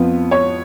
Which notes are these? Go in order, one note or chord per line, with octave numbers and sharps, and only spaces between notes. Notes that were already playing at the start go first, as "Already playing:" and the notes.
Already playing: F2 F3 B3
C#5